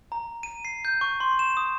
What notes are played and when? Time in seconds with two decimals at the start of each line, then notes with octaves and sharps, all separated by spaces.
0.12 A#5
0.43 D#7
0.65 C7
0.85 G6
1.01 C#6
1.20 C6
1.39 E7
1.57 D#6